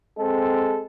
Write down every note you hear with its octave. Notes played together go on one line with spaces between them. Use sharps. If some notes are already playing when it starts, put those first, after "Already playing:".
G#3 C4 A4